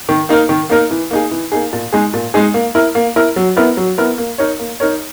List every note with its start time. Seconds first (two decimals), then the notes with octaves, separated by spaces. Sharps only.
0.09 D#3
0.29 A#3 D#4 A#4
0.49 D#3
0.70 A#3 D#4 A#4
0.91 E3
1.11 A#3 D#4 G#4
1.31 E3
1.52 A#3 D#4 G#4
1.73 A#2
1.93 G#3 D#4 G#4
2.14 A#2
2.34 G#3 D#4 G#4
2.54 A#3
2.75 E4 A#4
2.95 A#3
3.16 E4 A#4
3.36 F#3
3.57 B3 E4 A#4
3.77 F#3
3.98 B3 E4 A#4
4.18 A#3
4.38 D#4 A#4 C#5
4.59 A#3
4.80 D#4 A#4 C#5